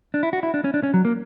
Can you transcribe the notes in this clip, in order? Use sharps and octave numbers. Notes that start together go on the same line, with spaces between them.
D4
E4
F#4
E4
D4
C#4
D4
C#4
F#3
A#3